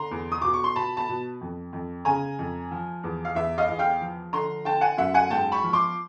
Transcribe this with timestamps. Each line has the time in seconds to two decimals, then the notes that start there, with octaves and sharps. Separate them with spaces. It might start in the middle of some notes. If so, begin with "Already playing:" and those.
Already playing: D3 A#5 C6
0.11 E2
0.32 D#6
0.42 B2 D6
0.54 C#6
0.64 C6
0.76 B2 A5 B5
0.97 A5 B5
1.09 B2
1.41 F2
1.73 F2
2.05 C#3 G#5 A#5
2.39 F2
2.71 F3
3.03 E2
3.25 F5
3.35 E2 E5
3.58 D#5 F5
3.68 E2
3.79 F5 G5
4.01 F3
4.33 D3 A#5 C6
4.65 D3 G5 A5
4.81 F#5 G#5
4.97 F#2 E5 F#5
5.14 F#5 G#5
5.30 G#2 G5 A5
5.52 B5 C#6
5.63 F3
5.73 C6 D6